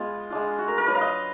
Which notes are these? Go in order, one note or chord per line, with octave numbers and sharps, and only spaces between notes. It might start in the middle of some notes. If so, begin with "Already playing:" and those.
Already playing: G#3 B3 F4
G#3 D4 F4
F#4
A#4
A#4
F#3 D4 F4 B4
F5
D#5